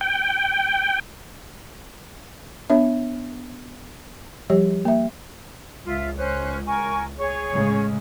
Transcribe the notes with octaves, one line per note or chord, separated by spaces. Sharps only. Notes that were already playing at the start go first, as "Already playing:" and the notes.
G5
B3 D4 C#5 E5
F3 G3 G4 C#5
A#3 E5
C#2 F4 E5
C#4 C5 F#6
A#4 G#5 C#6
G#4 C#5 C#6
A2 C#3 G#3